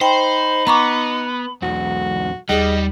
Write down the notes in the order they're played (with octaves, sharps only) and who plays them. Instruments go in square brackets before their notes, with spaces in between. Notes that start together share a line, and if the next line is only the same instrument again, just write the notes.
[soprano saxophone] D#4 [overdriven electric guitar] C5 [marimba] G5 [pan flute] B5
[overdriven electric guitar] B3 [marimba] A#5 C#6 D6
[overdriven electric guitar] B1 E2 [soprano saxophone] F#4
[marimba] D#2 [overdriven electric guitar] G3 [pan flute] G#4 [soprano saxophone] D#5